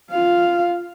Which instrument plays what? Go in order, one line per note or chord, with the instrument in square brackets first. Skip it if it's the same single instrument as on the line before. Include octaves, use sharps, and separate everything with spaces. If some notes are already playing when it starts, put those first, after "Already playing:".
[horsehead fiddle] F4 F5